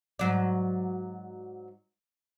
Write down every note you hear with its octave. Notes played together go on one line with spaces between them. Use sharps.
G#2 F#3 D5